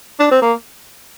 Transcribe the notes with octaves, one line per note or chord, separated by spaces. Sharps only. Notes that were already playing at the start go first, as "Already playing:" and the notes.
D4
C4
A#3